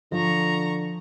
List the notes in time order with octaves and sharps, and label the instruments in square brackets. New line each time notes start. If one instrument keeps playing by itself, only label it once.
[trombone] D3 [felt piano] F3 [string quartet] A#5 C#6